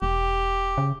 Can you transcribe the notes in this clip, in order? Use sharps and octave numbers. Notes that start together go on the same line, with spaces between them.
E1 G4
C#3